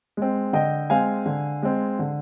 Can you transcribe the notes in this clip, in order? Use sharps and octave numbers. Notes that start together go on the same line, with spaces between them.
G#3 C4
D3 D#5 G5
G#3 C4 F5 G#5
D3
G#3 C4
D3